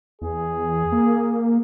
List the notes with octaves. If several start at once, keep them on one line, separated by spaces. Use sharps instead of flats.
E2 G#4
A#3